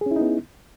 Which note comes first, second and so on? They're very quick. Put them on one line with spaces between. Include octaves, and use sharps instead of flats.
G#4 C#4 E4 D#4 B3